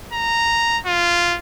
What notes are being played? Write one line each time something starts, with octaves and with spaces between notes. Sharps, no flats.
A#5
F4